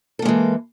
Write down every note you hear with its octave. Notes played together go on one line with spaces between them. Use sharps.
E3 G#3 A#3 A4